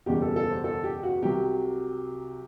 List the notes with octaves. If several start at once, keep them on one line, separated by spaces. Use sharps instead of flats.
F#1 E2 B2 G3 G4
A4
A4
C5
A4
G4
F#4
C2 C3 F#3 G4